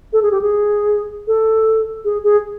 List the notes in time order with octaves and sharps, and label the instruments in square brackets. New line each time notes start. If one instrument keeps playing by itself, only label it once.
[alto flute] A4
G#4
G4
G#4
A4
G#4
G#4